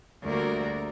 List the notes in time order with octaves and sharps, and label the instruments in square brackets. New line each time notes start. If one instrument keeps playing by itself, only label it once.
[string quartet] D2 G3 A#3 F#4 A#4 D5